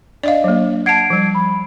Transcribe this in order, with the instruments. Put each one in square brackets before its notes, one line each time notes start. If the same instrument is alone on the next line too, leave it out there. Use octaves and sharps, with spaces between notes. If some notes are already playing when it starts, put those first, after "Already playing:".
[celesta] D4 [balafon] D5 D#5 F5
[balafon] F#3 A#3
[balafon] F#5 A5 [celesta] G#6 C7 D7
[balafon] F3 G3
[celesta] B5